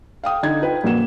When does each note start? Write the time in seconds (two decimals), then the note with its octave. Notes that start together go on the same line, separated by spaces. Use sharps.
0.24 F5 G5 D#6
0.43 D3 D#4 G#6
0.61 F4 B4 G5
0.84 A#1 F#2 A#3 F#4 E7